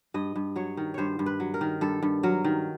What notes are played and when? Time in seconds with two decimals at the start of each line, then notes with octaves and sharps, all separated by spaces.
0.14 G2 D#5
0.36 G2
0.56 F#3 C#5
0.77 D#3
0.94 G2 C5 C#5
1.19 G2
1.26 B4
1.40 F#3
1.54 A#4
1.61 D#3
1.81 G2 A4
2.03 G2
2.23 F#3 A#4
2.44 D#3